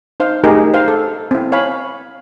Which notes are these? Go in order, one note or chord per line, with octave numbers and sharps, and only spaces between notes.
D#4 C5 F5
A3 D#4 G4 G#4 A#4
C5 F5
A4
C4 E4
C#5 F5 G#5 B5